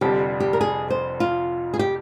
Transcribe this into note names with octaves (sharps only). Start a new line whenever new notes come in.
F1 F2 D3 G3 G4
G4
A#4
G#4
C5
F4
G#4
G4